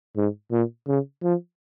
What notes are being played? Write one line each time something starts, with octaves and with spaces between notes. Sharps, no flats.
G#2
A#2
C#3
F3